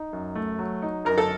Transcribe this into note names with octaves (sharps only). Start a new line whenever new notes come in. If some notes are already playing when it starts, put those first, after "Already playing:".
Already playing: D#4
F#2
A3
F#3
D#4
F#2 A#4
A4